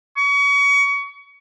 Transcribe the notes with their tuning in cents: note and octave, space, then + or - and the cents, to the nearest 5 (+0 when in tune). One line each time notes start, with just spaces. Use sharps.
C#6 +30